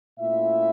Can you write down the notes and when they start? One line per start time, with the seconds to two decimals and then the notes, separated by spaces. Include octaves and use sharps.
0.19 A#2 A3 C#4 E4 F4 E5